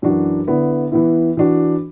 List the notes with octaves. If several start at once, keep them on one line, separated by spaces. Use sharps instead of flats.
F#2 E3 D4 F#4
D3 B3 E4
E3 B3 E4
E3 D4 F#4